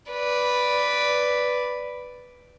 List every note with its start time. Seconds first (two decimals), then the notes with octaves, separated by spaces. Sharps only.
0.11 B4 D5